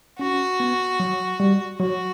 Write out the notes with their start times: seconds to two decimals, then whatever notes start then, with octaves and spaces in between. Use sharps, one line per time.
0.19 C#4 F#4
0.60 B3
1.00 F#3
1.40 G3
1.80 F#3 F#4